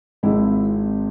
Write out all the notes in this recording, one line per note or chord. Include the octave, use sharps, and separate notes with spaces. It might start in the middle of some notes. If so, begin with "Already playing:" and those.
G#1 G#2 G#3 C4 E4